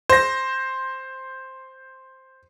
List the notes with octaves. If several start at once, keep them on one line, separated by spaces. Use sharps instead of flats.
C5 A#6